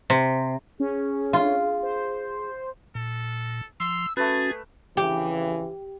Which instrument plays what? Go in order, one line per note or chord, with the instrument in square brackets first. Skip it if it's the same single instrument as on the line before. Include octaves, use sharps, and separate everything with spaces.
[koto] C3
[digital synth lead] C#4 [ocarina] G#4
[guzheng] F4
[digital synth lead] C5
[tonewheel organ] A#2 [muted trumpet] A4
[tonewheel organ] F3 [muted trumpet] C6 [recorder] E6
[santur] A3 B4 [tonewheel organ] C#4 F#4 [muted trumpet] G#4 [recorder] A6
[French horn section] F2 C#3 E3 [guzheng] G4